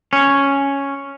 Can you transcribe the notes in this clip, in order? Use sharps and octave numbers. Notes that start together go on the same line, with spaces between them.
C#4